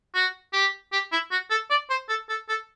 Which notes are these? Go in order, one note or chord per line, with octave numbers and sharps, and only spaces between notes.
F#4
G4
G4
E4
F#4
A4
D5
C5
A4
A4
A4